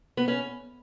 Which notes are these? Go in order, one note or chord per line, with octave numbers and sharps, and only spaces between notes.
B3
C#4